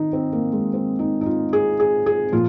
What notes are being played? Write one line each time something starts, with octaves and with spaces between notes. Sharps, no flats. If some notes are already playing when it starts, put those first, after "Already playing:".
Already playing: D#3 D#4
C4
A#3
G#3
C4
D#4
D#4
F4
G#4
G#4
G#4
A#2 F3 F4